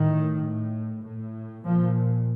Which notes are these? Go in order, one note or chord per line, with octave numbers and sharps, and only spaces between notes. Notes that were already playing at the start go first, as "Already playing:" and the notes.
Already playing: A2 D#3
A2
A2
A#2 F3